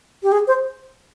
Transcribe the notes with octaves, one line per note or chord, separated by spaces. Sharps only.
G4
G#4
C5